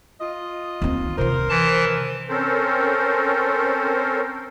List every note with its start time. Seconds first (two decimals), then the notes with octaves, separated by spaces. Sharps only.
0.20 F4 D#5
0.82 D#2 C4
1.18 C3 D#3 A#4 C5
1.49 E3 A5
2.29 C4 C#4 A4 A#4 C5